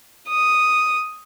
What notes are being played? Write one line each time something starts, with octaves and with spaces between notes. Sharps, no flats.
D#6